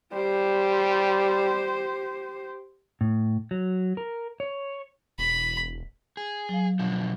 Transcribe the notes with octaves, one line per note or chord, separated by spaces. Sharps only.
G3 G4 C5
A2
F#3
A#4
C#5
E1 B5
G#4
F#3 F5
B2 D3 F3